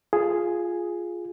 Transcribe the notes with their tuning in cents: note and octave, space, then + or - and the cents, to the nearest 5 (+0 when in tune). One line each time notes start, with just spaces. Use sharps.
F4 +0 G#4 +0